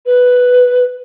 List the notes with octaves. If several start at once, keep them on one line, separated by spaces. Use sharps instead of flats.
B4